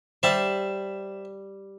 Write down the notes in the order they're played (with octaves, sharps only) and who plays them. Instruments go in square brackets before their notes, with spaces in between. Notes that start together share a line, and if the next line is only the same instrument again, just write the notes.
[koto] G3 [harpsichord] C5 E5 A5